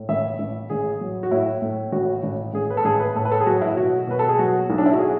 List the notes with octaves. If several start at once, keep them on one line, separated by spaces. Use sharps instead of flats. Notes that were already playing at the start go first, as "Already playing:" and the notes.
Already playing: A2
A1 E5
A1
A1 G#4
F#3
F#4
A2 E4
A2
A1 F#4
A1
A1 G#4
B4
A4
A1 G#4
B4
A2 A4
B4
A4
G#4
F#3 F#4
E4
B2 F#4
B2 B4
A4
G#4
F#3 F#4
B1
D4
E4
F#4
G#4